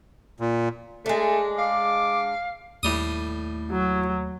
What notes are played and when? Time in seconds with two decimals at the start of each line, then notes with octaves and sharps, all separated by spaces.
0.40 A#2
1.06 G#3 A3 D4
1.58 F5 D6
2.83 D#2 A2 G3 A3 D#6
3.71 F#3